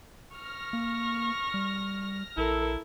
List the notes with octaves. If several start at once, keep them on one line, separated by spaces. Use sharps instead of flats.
C#6 F6 A#6
A#3
G3
A#1 E4 A4 A#4